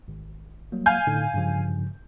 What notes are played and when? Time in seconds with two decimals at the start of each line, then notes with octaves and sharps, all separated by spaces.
0.08 G#1
0.72 F#3 G3 A#3
0.86 F5 G#5 G6
1.07 A2 D3 D#4
1.34 G2 C#3 F3